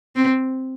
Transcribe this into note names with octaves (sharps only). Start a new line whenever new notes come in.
C4